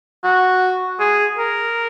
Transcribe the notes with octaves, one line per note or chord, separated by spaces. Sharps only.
F#4
G#4
A#4